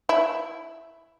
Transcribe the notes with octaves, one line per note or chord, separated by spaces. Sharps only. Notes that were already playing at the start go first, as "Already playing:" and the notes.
E4